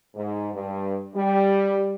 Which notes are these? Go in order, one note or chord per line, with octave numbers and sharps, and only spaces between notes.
G#2
G2
G3